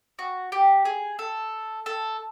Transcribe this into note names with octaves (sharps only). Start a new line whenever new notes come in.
F#4
G4
G#4
A4
A4